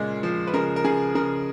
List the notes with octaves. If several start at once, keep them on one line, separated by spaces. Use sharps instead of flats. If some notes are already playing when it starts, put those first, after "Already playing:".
Already playing: A#2 C#3 G#3
F3
B4
C#3 A#4
A#4
C#3 G#4
C#3 A#4